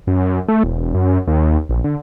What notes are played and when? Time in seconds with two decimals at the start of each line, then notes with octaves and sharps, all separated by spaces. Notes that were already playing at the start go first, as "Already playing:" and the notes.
0.07 F#2
0.48 A3
0.64 E1
0.94 F#2
1.27 D#2
1.69 A#1
1.84 D3